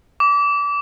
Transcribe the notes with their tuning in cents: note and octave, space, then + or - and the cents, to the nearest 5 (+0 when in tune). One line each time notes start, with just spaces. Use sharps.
D6 -25